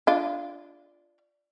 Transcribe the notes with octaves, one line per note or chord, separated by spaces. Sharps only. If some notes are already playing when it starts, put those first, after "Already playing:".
D4 F4